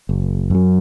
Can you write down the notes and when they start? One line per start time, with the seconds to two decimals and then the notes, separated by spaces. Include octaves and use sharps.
0.09 F#1
0.50 F#2 F#3